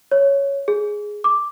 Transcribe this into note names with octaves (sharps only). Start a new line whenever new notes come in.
C#5
G#4
D6